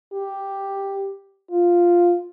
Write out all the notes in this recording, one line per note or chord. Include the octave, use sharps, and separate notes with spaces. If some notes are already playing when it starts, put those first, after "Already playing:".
G4
F4